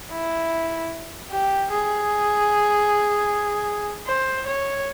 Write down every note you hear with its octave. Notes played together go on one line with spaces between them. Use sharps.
E4
G4
G#4
C5
C#5